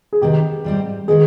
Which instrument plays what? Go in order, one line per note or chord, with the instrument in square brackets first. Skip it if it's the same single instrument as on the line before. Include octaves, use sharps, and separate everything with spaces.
[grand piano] G#4
[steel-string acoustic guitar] C3 D#3 B3 D#4 [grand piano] G4
[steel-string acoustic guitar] G#2 G3 C4 G4
[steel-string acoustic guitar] D#3 G#3 B3 [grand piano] G#4